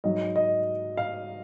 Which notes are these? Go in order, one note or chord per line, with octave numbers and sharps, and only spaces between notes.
G#2 F#3 D#5
D#5
F5